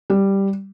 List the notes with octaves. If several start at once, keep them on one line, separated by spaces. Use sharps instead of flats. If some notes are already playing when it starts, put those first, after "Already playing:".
G3